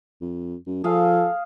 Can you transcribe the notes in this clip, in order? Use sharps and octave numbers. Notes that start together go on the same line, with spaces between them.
F2
F#2
F3 G#4 A4 F5